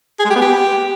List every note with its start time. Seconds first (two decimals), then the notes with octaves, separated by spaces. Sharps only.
0.19 G#4
0.25 G#3
0.30 G4
0.36 B3
0.42 G4